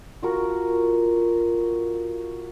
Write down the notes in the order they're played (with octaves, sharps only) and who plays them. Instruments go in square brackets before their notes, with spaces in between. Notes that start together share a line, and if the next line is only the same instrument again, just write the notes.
[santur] F4 F#4 A#4